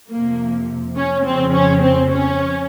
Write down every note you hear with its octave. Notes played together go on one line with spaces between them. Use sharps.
F2 C3 F3 A#3
C#4
F2 C#3 F3 C4
C#4
C4
C#4